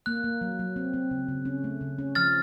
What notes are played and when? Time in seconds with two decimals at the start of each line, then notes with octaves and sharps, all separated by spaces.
0.06 A#3 F#6
0.24 A#3
0.41 F#3
0.59 F#3
0.76 C4
0.94 C4
1.11 C#3
1.28 C#3
1.45 C#4
1.64 A3
1.81 C#3
1.98 C#4
2.15 F3 F6 A6